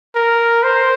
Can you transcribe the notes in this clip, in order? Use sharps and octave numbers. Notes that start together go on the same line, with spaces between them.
A#4
C5